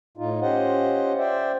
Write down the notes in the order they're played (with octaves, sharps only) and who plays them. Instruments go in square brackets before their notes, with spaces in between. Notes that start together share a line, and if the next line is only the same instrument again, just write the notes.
[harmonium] A2 D#4 F4
C#4 F4 G4 C5 D#5 F#5
C5 D5 E5 G5